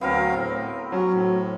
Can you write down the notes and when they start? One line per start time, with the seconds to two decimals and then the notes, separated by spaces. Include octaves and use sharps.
0.01 D2 F#3 B3 C4 A#4 F5
0.35 A2
0.92 F#3 C#4
1.13 A2